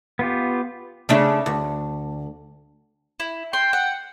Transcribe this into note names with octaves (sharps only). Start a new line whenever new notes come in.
B3 F4 G4
C#3 A3 D4
D2
E4
G5 C6
F#5